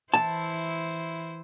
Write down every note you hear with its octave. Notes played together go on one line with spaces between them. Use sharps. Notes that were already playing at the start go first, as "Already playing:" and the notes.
E3 E4 C5 A5